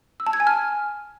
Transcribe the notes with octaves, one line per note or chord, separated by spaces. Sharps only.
E6
A5
G#6
G#5
F6